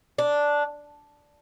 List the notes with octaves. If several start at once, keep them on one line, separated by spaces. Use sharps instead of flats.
D4